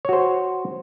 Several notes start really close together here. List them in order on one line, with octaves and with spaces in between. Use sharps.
C#5 F#4 C5